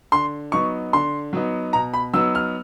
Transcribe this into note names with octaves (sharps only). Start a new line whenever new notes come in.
D3 C6
F#3 B3 D#4 C#6
D3 C6
F#3 B3 D#4
B2 A#5
B5
F#3 B3 D#4 E6
F6